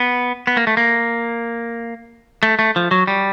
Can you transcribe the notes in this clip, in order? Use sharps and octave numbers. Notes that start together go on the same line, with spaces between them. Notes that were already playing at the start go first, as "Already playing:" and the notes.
Already playing: B3
B3
A#3
A3
A#3
A3
A3
F3
F#3
G3